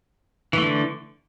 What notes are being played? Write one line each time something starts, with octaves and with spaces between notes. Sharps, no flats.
D3 E3 A3